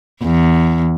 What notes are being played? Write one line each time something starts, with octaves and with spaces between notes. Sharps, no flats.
E2